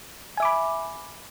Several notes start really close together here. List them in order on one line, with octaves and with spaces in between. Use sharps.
G#5 E5 D6 B5